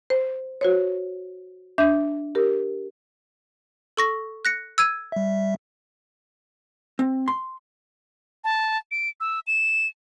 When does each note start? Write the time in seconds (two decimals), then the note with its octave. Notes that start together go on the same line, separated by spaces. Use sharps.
0.10 C5
0.61 F#4 C5 C#5
1.78 D4 E5 G6
2.35 G4 A#4
3.97 A4 C#6 A#6
4.45 F#6 A#6 C#7
4.78 E6 G#6 D#7
5.12 G3 E5
6.99 C4
7.28 C6
8.44 A5
8.91 D7
9.20 E6
9.47 E7